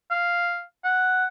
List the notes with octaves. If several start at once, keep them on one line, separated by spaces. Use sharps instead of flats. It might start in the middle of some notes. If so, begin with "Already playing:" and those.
F5
F#5